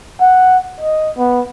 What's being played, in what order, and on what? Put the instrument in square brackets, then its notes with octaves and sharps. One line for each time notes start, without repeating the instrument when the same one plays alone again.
[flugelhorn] F#5
D#5
B3